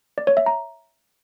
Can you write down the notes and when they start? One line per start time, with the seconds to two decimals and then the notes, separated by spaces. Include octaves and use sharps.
0.18 D5
0.27 C#5
0.37 E5
0.46 A#5